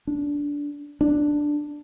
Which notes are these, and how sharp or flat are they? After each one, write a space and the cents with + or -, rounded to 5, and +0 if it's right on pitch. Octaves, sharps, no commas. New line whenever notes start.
D4 -15
D4 +5